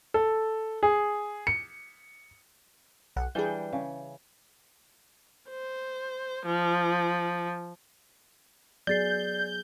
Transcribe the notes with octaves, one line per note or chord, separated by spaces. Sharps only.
A4
G#4
C#7
B1 F#5
E3 G3 D4 G#4 G6
C#3
C5
F3
F#3 B3 G#4 D5 G6 A6 C7